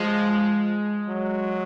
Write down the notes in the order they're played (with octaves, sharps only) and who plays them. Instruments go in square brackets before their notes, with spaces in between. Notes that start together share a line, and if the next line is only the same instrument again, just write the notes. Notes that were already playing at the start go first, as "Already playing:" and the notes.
Already playing: [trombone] F3 [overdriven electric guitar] G#3
[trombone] F#3